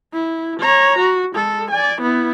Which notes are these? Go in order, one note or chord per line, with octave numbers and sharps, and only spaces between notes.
E4
C#5 A#5
F#4
G#3 A4
D5 G#5
B3 E4